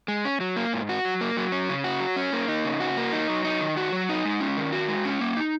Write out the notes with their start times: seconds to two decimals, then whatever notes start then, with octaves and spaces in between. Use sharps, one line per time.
0.08 G#3
0.25 C#4
0.40 F#3
0.56 A#3
0.73 G#2
0.89 F#4
1.05 F#3
1.21 A#3
1.37 F#3
1.52 C#4
1.69 C#3
1.84 F#4
2.00 F#3
2.16 C#4
2.33 A#3
2.48 D#4
2.65 C#3
2.80 F#4
2.97 A#3
3.13 D#4
3.29 F#3
3.44 D#4
3.61 D#3
3.77 F#4
3.92 F#3
4.09 D#4
4.25 G#3
4.40 C#4
4.57 D#3
4.72 F#4
4.88 G#3
5.05 C#4
5.21 A#3
5.37 D#4